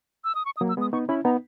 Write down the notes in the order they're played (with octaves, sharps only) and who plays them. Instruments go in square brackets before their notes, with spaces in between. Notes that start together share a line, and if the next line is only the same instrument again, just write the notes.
[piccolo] E6
D#6
C#6
D#6
[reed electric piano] F#3 A#3
[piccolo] E6
[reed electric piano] G#3 B3 [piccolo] D#6
[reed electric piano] B3 D#4 [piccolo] C#6
[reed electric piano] C#4 E4 [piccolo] B5
[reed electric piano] B3 D#4 [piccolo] A#5